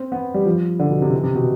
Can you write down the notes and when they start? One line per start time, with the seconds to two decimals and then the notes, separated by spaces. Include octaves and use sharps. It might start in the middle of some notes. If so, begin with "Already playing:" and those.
Already playing: C4
0.12 B3
0.34 G3
0.46 F3
0.79 D3
0.90 B2
1.02 C3
1.13 E3
1.23 C3
1.35 B2